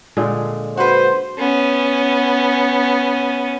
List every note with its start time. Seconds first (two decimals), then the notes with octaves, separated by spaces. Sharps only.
0.17 A#2 D3 G#3
0.77 F#4 B4 C5
1.38 B3 C#4